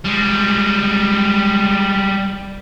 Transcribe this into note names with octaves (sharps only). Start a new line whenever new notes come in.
G3 G#3